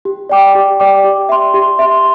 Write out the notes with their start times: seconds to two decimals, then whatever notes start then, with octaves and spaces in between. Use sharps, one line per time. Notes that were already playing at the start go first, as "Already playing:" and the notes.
0.05 G4
0.29 D5 G5 D6
0.55 G4
0.80 D5 G5 D6
1.04 G4
1.29 E5 C6
1.54 G4
1.79 E5 C6